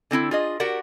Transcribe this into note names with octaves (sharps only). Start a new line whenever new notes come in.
D3 C4 D#4 E4
F4 G#4 D#5
F#4 G4 A#4 D5 F#5